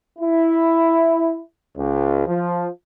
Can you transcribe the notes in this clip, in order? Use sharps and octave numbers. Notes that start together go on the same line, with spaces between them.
E4
C#2
F3